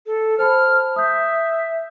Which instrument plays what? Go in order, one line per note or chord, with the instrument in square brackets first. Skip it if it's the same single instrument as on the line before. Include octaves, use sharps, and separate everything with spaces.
[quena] A4
[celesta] C5 A5 B5 [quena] F6
[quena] E5 [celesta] D#6 G6